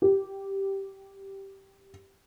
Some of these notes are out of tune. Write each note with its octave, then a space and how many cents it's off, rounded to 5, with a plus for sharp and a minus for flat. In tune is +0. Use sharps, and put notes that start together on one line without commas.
G4 -5